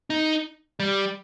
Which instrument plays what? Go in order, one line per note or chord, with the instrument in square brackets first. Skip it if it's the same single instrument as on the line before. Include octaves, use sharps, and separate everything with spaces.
[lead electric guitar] D#4
G3